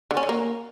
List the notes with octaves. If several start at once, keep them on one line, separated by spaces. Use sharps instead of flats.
D3
C#4
D3
A#3